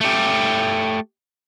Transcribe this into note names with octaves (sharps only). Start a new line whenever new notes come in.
A3 G4